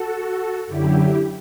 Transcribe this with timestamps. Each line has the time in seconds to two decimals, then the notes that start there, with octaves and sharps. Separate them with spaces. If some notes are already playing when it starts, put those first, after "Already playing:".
Already playing: F#4 A4
0.67 F#2 D3 F#3 E4 G4